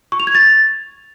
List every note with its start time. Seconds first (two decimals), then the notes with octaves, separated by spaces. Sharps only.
0.12 C#6
0.20 F7
0.27 G#6
0.35 A6